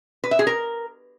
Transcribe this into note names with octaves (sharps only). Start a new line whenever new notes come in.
B4
E5
G#4
A#4